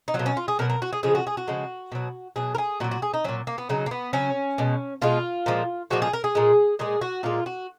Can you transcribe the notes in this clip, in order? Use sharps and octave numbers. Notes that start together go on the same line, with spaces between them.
D#4
F#3 F4
B2
C#4
F4
G#4
B2 F#3 A#4
A#4
F#4
G#4
C#3 F3 G#3 G#4
F#4
G#4
F#4
C#3 F3 G#3
B2 F#3
B2 F#3 G#4
A#4
G#4
A#2 F#3 F#4
F#4
G#4
D#4
A#2 F#3 C#4
A#3
B3
C#3 F#3 D#4
A#3
B3
C#3 F#3 C#4
B2 G#3
B2 G#3 F4
A#2 F3 G#3
A#2 F3 G#3 F#4
G#4
A#4
G#4
A#2 G#3
A#2 G#3 G#4
F#4
A#2 G#3 F4
F#4